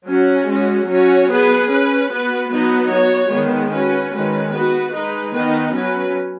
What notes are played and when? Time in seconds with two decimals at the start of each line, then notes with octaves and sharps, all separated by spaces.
0.08 F#3 C#4 F#4
0.48 G#3 C#4 F#4
0.88 F#3 C#4 F#4 C#5
1.29 B3 G#4 B4
1.70 C#4 B4
2.10 B3 F#4 B4
2.50 F#3 B3 D#4 F#4 B4
2.90 B3 F#4 C#5
3.31 D#3 G#3 B3
3.72 C#4 F#4 B4
4.12 D#3 G#3 C#4 B4
4.52 B3 F#4 B4
4.93 G#3 D#4 B4
5.33 D#3 B3 D#4 B4
5.73 F#3 C#4 B4